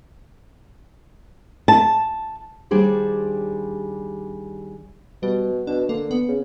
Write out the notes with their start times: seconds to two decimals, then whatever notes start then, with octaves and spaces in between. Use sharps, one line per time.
1.68 A5
2.71 D#2 G3 D4 G#4 C5
5.23 B2 G3
5.67 B2 D4
5.89 D3 A#3
6.11 B3
6.28 C#3